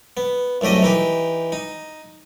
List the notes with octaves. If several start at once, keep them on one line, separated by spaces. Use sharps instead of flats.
B3
C2 F#2 A3 G4 D#5
E3 D#4 G4
D#4